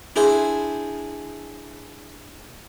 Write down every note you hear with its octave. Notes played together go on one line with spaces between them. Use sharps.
D4 E4 G#4 C5